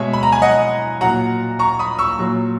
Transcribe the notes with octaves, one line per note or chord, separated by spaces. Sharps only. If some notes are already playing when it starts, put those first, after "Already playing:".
Already playing: B2 G#3 C#5 E5
B5
A#5
G#5
D#5 F#5
A#2 F#3 F#5 A#5
A#5 C#6
B5 D#6
C#6 E6
A#2 F#3